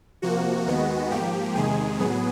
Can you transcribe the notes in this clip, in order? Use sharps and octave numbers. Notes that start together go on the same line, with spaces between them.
C3 F3 A#3 F#4
D#2 D#3 G#3 B3
G#2 F3 A#3 G4
E2 C3 D#3 G#3 G#4
A2 F#3 B3